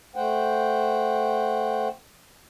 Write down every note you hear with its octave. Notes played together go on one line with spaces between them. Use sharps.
A3 C5 F#5 G5